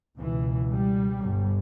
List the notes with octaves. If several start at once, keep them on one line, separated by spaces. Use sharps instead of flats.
C#2 B2 E3
G3
G1 G2